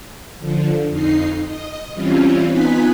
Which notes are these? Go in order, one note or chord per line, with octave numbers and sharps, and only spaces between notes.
D3 F3
F2 D#4 C7
D#5
E3 G3 C4 C#4 F4
B3 D#4 F4 G#5 F#6 B6